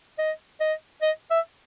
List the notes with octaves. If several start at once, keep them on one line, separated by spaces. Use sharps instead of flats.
D#5
D#5
D#5
E5